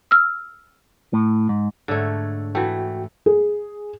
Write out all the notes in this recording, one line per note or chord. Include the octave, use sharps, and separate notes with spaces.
E6 F6
A2
G#2
G#2 D3 A3 C#5 G#6
E3 A3 F#4 G5
G#4